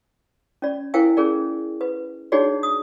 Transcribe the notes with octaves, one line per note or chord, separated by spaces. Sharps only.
C#4 D5
E4 A#4 C5 F5 G5 G#5
C#4 G#4 A#4 D5
B4
D4 D#4 F#4 G#4 C#5 D5
D#6